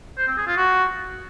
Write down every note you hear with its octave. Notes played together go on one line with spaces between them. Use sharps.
C5
C4
G#4
F4
F#4